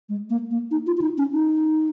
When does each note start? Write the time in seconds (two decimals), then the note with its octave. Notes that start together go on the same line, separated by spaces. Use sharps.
0.09 G#3
0.30 A#3
0.51 A#3
0.71 D#4
0.87 F4
0.97 F4
1.01 D#4
1.18 C#4
1.33 D#4